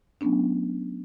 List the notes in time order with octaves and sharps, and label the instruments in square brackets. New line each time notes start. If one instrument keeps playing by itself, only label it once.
[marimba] F#3 A3 B3 C#4 D4